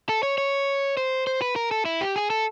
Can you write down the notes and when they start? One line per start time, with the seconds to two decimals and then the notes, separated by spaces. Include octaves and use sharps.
0.09 A4
0.23 C#5
0.38 C#5
0.97 C5
1.27 C5
1.42 B4
1.56 A#4
1.71 A4
1.85 E4
2.01 G4
2.16 G#4
2.30 A4